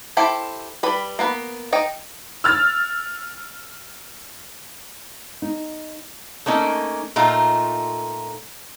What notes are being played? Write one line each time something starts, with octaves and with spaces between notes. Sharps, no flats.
E4 G4 A4 C5
G3 B4 B5
A#3 B3 B4
D#4 D#5 G5
E6 F6 A6
D#4
A3 A#3 C#4 D#4
A#2 A3 D#4 F4 A#5